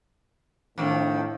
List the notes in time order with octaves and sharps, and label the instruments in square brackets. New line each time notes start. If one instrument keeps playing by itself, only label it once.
[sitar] F2 D#3 [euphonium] A2 [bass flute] D4